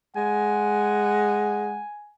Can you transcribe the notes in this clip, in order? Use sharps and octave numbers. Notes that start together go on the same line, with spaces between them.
G#3 F#5 G#5